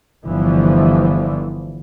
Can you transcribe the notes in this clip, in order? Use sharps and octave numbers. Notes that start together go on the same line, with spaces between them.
G1 D3 E3 F3